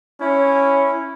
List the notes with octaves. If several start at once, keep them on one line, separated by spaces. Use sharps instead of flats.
C#4 E4